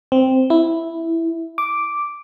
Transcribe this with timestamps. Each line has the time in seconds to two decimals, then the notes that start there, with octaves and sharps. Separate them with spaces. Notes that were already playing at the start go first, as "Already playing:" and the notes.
0.12 C4
0.50 E4
1.58 D6